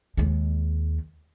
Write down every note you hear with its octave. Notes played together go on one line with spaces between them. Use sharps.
D#2 G#3